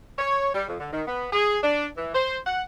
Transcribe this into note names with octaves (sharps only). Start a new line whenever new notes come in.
C#5
G3
F2
D3
D#3
B3
G#4
D4
E3
C5
F#5